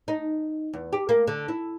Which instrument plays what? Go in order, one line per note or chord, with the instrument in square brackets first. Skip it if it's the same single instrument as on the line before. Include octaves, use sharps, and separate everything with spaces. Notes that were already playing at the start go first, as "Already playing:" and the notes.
[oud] D#4
E2
G4
A#3
D3
E4